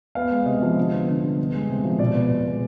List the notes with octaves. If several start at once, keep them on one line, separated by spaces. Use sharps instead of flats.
B3 F5
G#3
C3 D#5
F3
D3
B3
D3
G3
B3
G#3
C3
F3
B2 D5
B3
B2
G#3